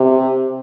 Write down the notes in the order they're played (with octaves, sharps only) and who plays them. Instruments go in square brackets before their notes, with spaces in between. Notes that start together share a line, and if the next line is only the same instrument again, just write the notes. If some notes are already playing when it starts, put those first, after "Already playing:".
Already playing: [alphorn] C3